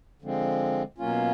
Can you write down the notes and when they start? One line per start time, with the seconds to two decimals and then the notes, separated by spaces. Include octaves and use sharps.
0.22 D3 F3 G#3 C4
0.98 B2 F#3 A#3 C#4 F4